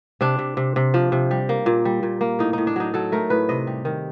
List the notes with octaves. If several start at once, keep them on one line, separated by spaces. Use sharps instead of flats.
C3 D4
C3
C3
C3
F3
C3
G3
A#3
A#2
G3
A#2
A#3
A2 D#4
A2 D#4
D4
F#3 D#4
F#3 A4
A3 A#4
A2 B4
C3 D#5
G3
D#3